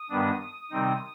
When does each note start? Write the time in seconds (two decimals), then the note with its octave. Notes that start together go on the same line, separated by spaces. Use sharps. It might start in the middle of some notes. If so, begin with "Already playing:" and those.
Already playing: D#6
0.10 G2 D#3 G3 B3 D4
0.70 C3 D#3 G3 C4 D#4